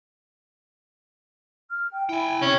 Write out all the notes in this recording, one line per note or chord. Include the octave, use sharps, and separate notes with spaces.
F6
G5
E4 G5 G#5
C3 C#4